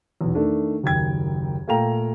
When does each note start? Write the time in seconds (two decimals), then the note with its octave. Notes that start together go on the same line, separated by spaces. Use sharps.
0.21 B1 E2
0.34 D#3 A3 D4
0.83 F#1 D#2 G5 G#6
1.67 A#2 A3 F5 G5 A#5 F7